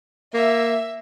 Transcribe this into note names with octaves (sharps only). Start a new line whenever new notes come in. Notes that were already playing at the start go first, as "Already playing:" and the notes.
A#3 E5